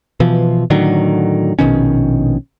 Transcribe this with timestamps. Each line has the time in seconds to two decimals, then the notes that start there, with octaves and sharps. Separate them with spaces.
0.20 B2 E3 F3
0.70 A2 D3 D#3 F#3
1.59 A#1 B2 D#3 C#4